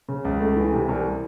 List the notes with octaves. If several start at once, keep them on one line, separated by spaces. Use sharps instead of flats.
C#3
C#2
A3
E3
C3
C2